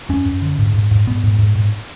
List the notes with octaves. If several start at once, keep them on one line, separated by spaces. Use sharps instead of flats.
F#2 C#4
F#2
D3
G#2
G#2
G#2
G#2 B3
G#2
G#2
G#2